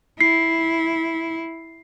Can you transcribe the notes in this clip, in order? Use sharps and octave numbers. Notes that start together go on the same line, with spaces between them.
E4 C7